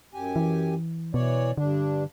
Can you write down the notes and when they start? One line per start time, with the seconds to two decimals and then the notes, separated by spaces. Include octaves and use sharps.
0.14 F#2 G4 G#5
0.36 E3
1.14 B2 E3 C#5 D5
1.57 G2 D3 D4